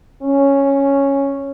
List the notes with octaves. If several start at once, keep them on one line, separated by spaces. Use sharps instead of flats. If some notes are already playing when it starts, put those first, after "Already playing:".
C#4